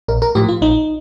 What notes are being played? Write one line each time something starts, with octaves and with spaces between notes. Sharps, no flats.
A#1 A#4
A#4
A2 F3 G4
F4
A#1 D#4